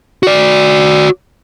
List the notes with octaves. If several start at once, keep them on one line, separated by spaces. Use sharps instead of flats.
F#4 D5